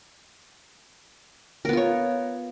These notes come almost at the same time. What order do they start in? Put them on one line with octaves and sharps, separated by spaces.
A#4 B3 F4 C#5